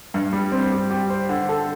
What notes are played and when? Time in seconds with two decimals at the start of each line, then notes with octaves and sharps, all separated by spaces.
0.14 G2
0.33 G3
0.52 C4
0.72 G3
0.90 G4
1.10 C5
1.29 D3
1.49 A4